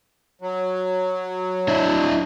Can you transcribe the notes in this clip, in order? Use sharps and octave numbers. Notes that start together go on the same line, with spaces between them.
F#3
D4 E4